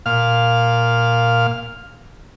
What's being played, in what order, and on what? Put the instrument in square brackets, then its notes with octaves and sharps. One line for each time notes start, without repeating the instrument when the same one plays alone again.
[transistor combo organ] A#2 F5 F6